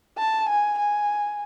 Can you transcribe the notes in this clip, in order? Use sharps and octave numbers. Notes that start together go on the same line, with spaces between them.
A5
G#5
G#5